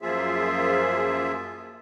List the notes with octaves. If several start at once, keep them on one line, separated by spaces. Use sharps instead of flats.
F#2 F3 A#3 F4 G#4 E5